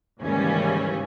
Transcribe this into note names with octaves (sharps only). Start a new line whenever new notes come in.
D#2 G#2 C#3 E3 G3 C#4